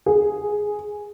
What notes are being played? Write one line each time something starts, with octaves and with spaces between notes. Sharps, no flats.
G#4